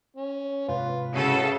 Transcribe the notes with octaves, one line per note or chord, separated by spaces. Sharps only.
C#4
G#2 C3 F4 B4
C#3 G#3 E4 F#4 A4